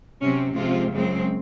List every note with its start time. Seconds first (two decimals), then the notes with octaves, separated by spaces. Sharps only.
0.21 C3 F#3 C4 C#4
0.55 C3 F3 G#3 C4 F4
0.91 F#2 C#3 G#3 C4